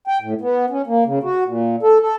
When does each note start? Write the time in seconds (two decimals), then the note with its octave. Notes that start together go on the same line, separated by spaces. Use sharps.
0.07 G5
0.22 A2
0.41 B3
0.70 C#4
0.87 A#3
1.06 C#3
1.23 F#4
1.46 A#2
1.83 A4
2.01 A4